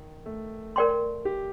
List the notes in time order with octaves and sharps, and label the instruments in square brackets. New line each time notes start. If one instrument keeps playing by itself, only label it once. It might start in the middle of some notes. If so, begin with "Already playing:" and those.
Already playing: [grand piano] D#3
A3
[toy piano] A#4 D5 G5 C6
[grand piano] G4